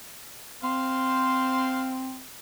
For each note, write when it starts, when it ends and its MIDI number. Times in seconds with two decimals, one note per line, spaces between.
0.63 2.21 60
0.63 1.99 72
0.63 1.99 77
0.63 1.99 84